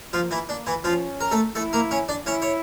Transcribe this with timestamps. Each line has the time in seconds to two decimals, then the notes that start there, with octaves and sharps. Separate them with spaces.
0.13 F3 A#3 F4
0.31 E3 E4
0.49 A#3 D4
0.67 E3 E4
0.84 F3 C#4 F4
1.21 A#4
1.31 A3 A4
1.55 A3 E4 A4
1.73 A#3 A#4
1.91 C#4 C#5
2.09 D4 D5
2.26 C#4 E4 C#5
2.42 C#5